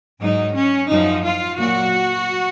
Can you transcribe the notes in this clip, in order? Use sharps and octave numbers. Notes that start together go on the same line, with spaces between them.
G#2 F#3 D#4
C#4
F#2 F3 D#4
F4
A#2 F#3 F#4